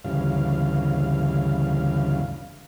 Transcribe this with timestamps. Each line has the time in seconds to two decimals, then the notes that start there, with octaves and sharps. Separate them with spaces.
0.04 D2 G2 C#3 E3 F5